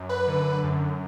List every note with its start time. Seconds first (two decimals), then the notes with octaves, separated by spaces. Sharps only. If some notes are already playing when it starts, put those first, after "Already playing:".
Already playing: F#2
0.09 B4
0.28 D3
0.64 F#2